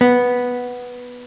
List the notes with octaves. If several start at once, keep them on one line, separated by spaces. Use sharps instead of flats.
B3